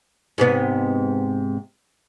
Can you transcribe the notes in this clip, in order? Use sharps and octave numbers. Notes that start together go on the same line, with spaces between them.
G#2 C3 B3